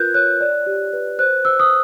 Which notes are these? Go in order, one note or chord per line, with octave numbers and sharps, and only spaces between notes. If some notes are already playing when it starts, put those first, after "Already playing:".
Already playing: F4 A#4 B4 F#6 G6
C#5 F#6
D5
G4
B4
C5 F#6
C5 E6
D#6